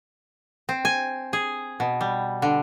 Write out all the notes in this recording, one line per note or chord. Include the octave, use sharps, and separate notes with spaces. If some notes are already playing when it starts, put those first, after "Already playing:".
C4
G#5
G#4
B2
G3
D3